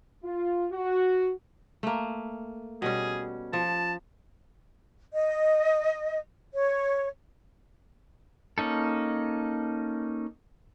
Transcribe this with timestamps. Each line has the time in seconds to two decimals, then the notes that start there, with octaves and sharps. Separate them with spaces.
0.24 F4
0.72 F#4
1.83 A3 A#3
2.82 B2 G3 C#4 G#4
3.53 F3 A5
5.14 D#5
6.53 C#5
8.58 A#3 C#4 D#4 A4